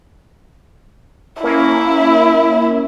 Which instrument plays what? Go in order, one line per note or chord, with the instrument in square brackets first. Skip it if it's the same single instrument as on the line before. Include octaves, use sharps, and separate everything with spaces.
[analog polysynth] A#3 C#4 [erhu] E4